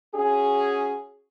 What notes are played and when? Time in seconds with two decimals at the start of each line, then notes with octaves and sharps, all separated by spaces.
0.15 C#4 F#4 G#4